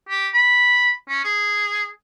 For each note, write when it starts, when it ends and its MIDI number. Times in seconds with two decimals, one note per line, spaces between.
0.09 0.29 67
0.34 0.92 83
1.09 1.23 61
1.25 1.87 68